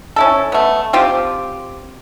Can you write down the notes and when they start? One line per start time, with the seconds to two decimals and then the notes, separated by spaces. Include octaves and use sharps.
0.16 C#4 E4 A4
0.52 A3 B3
0.93 C4 F4 G4